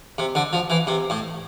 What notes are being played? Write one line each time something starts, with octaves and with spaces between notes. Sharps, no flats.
C3
D3
F3
E3
C3
A2